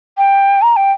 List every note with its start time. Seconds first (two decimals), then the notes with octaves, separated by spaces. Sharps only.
0.17 G5
0.62 A#5
0.76 G5